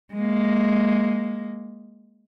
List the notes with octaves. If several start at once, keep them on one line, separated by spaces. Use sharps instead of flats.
G#3 A#3